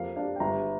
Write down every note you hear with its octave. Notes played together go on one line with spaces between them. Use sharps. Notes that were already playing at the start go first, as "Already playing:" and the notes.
Already playing: F2 A#3 F5
D4 F5
G5
G1 A#5